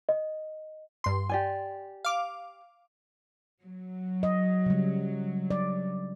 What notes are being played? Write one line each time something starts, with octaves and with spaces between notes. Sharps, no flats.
D#5
G2 C6
G4 D5 G#5
F5 D6
F#3
D#5
C#3 G3
D5